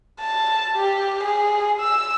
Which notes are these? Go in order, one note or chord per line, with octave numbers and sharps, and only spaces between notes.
A5
G4
G#4
E6